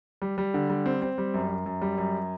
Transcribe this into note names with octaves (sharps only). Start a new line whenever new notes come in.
G3
G3
D3
G3
C4
C4
G3
F#2
F#2
F#2
G3
F#2